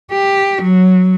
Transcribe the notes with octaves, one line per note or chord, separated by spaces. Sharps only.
G4
F#3